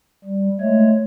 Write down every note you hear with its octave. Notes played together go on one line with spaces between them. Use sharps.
G3
G#3 A3 C#5